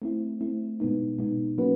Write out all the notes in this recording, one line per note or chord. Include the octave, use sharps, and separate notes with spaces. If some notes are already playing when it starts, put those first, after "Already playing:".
A3 C4 E4
A3 C4 E4
B2 G#3 B3 D#4
B2 G#3 B3 D#4
F#3 A#3 C#4 F#4 B4